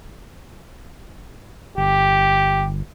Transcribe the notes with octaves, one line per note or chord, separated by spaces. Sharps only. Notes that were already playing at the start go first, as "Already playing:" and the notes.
G1 G4